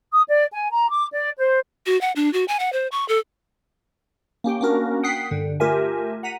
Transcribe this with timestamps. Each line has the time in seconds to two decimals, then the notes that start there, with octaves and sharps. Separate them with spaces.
0.12 D#6
0.28 D5
0.52 G#5
0.71 A#5
0.91 D6
1.14 D5
1.38 C5
1.86 F#4
2.01 F#5
2.16 D4
2.33 F#4
2.48 G#5
2.59 F#5
2.73 C5
2.92 C#6
3.08 A4
4.44 A#3 C#4 G4 G5
4.61 A#3 B3 C#4 D4 F#4 A#4
5.03 F#5 G5 D#6 F#6 B6 C7
5.31 G2 D3
5.60 A3 F4 G4 A#4 E5 G#5
6.23 F#5 A#5 B6 D#7